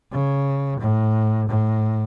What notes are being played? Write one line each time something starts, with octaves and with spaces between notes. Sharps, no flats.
C#3
A2
A2